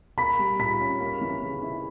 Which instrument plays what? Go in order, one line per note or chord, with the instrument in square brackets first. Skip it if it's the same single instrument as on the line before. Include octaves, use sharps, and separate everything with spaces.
[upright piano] A#3 [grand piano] B5 B6
[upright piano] G3
[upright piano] A#2 [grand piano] B5 B6
[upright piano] C#4
A#3
E3
C#3
E4